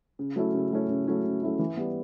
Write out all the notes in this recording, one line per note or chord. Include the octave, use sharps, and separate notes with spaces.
C#3
F#3 A3 C#4 E4
C#3
F#3 A3 C#4 E4
C#3
F#3 A3 C#4 E4
C#3
F#3 A3 C#4 E4
E3
G3 B3